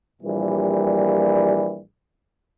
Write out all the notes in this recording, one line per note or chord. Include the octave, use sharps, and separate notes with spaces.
A#1 A#2 E3 G3